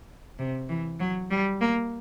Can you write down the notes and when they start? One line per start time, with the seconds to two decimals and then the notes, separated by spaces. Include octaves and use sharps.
0.39 C3
0.69 E3
1.00 F#3
1.30 G3
1.61 A#3